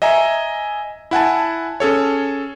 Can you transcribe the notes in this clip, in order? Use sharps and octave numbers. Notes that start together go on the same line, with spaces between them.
D#5 E5 G#5 A#5
E4 F#5 G#5 A5
C#4 G#4 A4 C#5